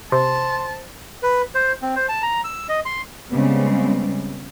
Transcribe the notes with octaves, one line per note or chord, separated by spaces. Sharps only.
C3 C5 A5 C6
B4
C5
C4
C5
A5
A#5
E6
D#5
C6
C#3 G3 G#3 B3 C4